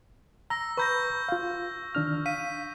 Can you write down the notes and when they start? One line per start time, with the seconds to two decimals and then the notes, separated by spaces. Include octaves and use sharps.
0.50 A#5 E6 A#6
0.77 B4 A#5 B5 C#6 G6 A#6
1.29 F4 F5
1.95 D#3 D4 F6
2.26 F5 B6 D#7